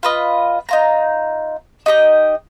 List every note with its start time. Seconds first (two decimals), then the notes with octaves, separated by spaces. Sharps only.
0.03 F4 B4 D#5
0.69 D#4 F4 A#5
1.86 D#4 G4 A4 D#5